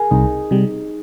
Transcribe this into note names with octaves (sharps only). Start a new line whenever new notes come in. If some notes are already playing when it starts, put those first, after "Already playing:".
Already playing: G#4 A#4
C2 D#4
C3 G3